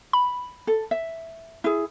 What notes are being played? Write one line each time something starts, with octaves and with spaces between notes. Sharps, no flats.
B5
A4
E5
E4 G#4